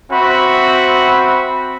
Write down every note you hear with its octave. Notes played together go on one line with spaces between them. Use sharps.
C4 F#4 E5 B5